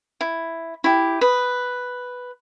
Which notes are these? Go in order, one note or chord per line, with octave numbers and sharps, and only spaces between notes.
E4
E4 G4
B4 D#6